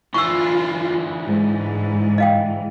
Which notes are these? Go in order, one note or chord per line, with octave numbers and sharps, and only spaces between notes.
D3 E3 F4 C#6 E6
G#2
D#5 F5 G5